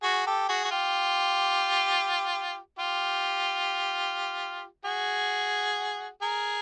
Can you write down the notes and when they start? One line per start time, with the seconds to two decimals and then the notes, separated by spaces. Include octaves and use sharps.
0.02 F#4 G#4
0.27 G4 A4
0.49 F#4 G#4
0.65 F#4
0.71 F4 G4
2.78 F4 G4
4.85 F#4 G#4
6.22 G#4 A#4